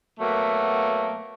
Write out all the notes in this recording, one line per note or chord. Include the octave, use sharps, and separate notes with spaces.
B2 F#3 A3 A#3